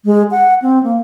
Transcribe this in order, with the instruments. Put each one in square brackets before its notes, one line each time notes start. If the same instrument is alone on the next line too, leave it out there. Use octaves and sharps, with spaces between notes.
[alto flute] G#3
F#5
C4
A#3